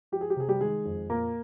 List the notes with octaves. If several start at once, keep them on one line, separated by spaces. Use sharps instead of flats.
F3 G4
G#4
G4
C3 G#4
G3 G4
D#3 G#3 G#4
F2
A#2 A#3 A#4